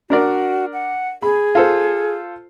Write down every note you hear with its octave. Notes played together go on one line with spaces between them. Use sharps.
D4 F#4 A#4 D5
F#5
G#4 B5
F4 A4 C5